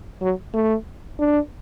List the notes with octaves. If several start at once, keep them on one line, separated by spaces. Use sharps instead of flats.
F#3
A3
D4